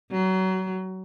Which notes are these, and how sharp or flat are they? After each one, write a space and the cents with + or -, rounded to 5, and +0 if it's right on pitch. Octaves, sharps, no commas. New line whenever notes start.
F#3 +25